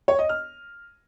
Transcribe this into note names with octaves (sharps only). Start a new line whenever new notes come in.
C#5
D#5
F6